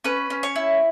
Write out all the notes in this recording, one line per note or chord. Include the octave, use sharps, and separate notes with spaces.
C#4 B4
C#4
C#5
E4